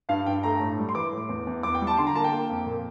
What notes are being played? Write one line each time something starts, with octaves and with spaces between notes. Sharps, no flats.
G2 F5
G2 G5
A3 A#5
A2
G3
C6
E3 D6
A2
E2
E2
E2 D6
G5
G3
A5
D3 C6
A#5
A#3 A5
G5
A#3
F2
A#2